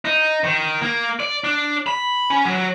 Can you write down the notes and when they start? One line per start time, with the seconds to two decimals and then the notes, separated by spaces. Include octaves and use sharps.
0.05 D#4
0.44 D#3
0.82 A#3
1.20 D5
1.44 D4
1.87 B5
2.30 C#4
2.45 F#3